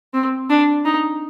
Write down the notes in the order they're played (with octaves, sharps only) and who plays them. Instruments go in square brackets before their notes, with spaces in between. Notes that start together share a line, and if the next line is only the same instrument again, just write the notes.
[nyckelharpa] C4
D4
D#4